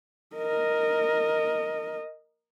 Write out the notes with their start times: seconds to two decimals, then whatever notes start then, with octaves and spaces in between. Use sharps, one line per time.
0.36 A#4 D#5